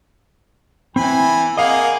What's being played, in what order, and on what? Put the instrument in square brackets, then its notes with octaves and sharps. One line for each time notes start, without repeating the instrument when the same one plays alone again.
[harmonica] E3 G#5 B5 [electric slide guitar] C4
[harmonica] A#3 G#4 [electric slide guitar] D#5 F5 F#5